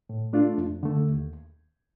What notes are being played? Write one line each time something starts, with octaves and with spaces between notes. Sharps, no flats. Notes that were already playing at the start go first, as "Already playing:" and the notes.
A2
A3 D4 F4
F2
D3 A3
D#2